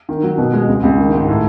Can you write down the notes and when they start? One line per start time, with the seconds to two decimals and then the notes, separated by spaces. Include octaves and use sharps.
0.09 D#3
0.23 F#3
0.38 B2
0.53 G#3
0.68 C#2
0.83 C#2
0.98 D#3
1.13 G#2
1.28 A2